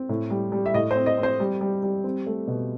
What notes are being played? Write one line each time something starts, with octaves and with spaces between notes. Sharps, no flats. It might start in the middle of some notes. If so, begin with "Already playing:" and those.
Already playing: C4
A2
G3
G3
E5
A2 D#5
C5
C4
D#5
C4
C5
G3
G3
G3
C4
A3
B2